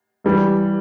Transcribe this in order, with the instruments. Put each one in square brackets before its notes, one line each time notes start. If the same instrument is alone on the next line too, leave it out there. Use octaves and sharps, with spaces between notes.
[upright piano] G2 E3 G3